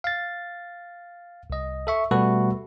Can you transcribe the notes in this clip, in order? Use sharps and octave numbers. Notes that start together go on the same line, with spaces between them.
F5 A6
C2 D#5
A4 E5 C#6
B2 G3 A3 F#4 A4 B4